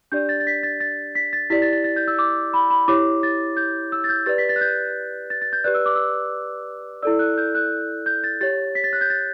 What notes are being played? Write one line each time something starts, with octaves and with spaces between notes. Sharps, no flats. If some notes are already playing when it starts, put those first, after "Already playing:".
D4 G4 D5 G6
A6
A6
B6
A6
A6
B6
A6
E4 G4 D5 B6
A6
A6
A6
G6
E6
D6
B5
B5
E4 G4 C#5 D6
A6
G6
E6
A6
G6
G4 B4 D5 A6
B6
A6
F#6
G6
A6
A6
G6
G4 B4 D5 F#6
E6
D6
E6
E4 A4 D5 E6
F#6
G6
F#6
G6
A6
G4 C#5 A6
B6
A6
F#6
G6
A6